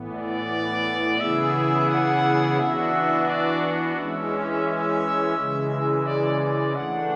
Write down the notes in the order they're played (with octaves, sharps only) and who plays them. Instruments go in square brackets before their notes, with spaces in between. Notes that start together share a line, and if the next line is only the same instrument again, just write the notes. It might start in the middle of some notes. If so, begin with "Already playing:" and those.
Already playing: [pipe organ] A2 E3 B3
[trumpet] D5
[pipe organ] C#3 E3 B3 E4 G#4 [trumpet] E5
[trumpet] F#5
[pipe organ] E3 B3 D4 F#4 [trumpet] E5
[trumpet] D5
[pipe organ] E3 G#3 C#4 [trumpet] E5
[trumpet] E5
[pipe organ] C#3 E3 G#3
[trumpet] D5
[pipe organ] E3 A3 D4 [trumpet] F#5